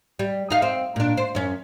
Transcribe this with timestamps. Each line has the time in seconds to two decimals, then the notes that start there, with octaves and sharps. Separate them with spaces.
0.19 G3
0.50 D#4 F5
0.62 C4
0.96 A#2 D4
1.17 C5
1.35 F#2 C#4